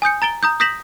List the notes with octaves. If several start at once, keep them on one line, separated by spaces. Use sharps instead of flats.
G#5 D#6 G6 C#7
A#5 A6 D7 G7
A#5 D#6 G6
D#6 G6 A#6 B6 E7 F#7